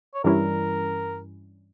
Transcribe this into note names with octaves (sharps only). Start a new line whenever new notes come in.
C#5
G2 E3 G3 C#4 E4 A#4